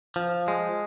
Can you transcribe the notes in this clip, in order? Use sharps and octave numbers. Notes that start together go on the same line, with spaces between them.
F3
G#3